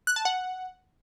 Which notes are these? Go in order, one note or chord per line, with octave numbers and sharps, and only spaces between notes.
F#6
A5
F#5